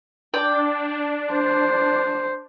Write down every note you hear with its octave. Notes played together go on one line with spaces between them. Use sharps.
D4 D5 G5
C5